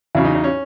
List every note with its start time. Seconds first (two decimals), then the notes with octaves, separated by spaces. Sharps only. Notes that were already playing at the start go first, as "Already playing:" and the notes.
0.15 E2 C#3 F#3 E4
0.25 D#4
0.35 D#4
0.44 C#4